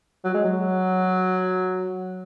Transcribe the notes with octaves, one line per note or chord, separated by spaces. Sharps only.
F#3
G#3
F#3